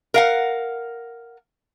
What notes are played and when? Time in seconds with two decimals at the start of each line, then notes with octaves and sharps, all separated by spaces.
0.14 A#4 F5 F#5